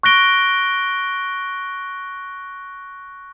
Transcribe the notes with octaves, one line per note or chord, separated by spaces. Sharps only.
C#6 F#6 A#6 D7 G7